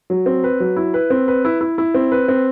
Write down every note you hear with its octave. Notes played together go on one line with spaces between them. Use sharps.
F#3
C4
B4
F#3
E4
B4
C4
B4
E4
E4
E4
C4
B4
C4